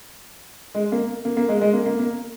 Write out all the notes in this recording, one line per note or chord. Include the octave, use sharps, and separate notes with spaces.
G#3
A#3
A#3
A#3
G#3
G#3
A#3
A#3
A#3